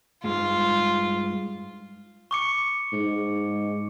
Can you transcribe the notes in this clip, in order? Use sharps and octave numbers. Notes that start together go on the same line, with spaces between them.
G2 G#3 F4
C#6 D6 C#7
G#2